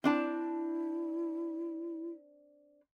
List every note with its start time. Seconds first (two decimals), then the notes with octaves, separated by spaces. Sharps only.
0.04 C4 D4 E4 A5